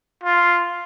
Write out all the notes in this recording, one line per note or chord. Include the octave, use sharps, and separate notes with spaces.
F4